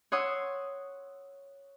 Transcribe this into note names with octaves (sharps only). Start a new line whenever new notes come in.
C#5 F#5 C6 D#6 E6